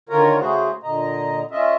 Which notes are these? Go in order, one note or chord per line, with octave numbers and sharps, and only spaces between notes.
D3 D#3 F4 A#4 C#5 A#5
C#3 A3 F#4 G#4 C5
A#2 D3 D#5 A#5
C#4 F4 D#5 E5